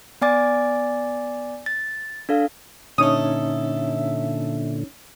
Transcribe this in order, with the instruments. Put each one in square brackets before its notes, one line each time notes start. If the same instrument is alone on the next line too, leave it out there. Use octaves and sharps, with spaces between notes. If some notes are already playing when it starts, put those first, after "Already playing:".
[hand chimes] B3 D5 G#5 D6 A6
A6
D4 A4 F5
[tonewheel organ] A#2 D3 [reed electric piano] C#4 D#4 C#5 [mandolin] A4 D#6 [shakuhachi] E5